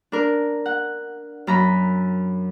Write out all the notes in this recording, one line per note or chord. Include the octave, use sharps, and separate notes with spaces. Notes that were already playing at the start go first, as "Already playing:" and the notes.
D4 A#4
F#5
F#2 A#5 B5